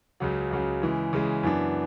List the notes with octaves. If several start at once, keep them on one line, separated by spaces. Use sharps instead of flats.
C#2 C#3 F#3
C#2 C#3 F#3
C#3 E3 G#3
C#3 E3 G#3
F#2 E3 B3 D4